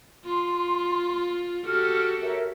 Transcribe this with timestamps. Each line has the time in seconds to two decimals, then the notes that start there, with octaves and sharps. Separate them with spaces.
0.25 F4 C6
1.65 F#4 G4 A4 F6
2.22 A#4 C#5 E5